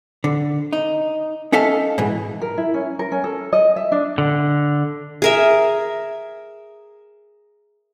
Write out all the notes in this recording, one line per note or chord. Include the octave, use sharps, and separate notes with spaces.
D3
D#4
C#4 D#4 A4 E5 F5 A5
G#2 B2 E3
A#4
E4
C#4
A#4
C#4
A4
D#5
E5
D4
D3
G#4 A#4 E5